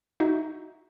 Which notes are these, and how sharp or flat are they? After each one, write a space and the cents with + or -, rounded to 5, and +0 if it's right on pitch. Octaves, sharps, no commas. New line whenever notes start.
D#4 +0 F#4 +0 E5 +0